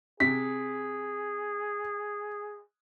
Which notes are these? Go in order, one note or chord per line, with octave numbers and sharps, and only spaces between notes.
C3 G#4 B6